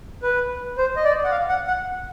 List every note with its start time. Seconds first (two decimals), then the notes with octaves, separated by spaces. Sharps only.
0.23 B4
0.78 C5
0.96 D#5
1.04 D5
1.24 F#5
1.31 F5
1.49 F#5
1.67 F#5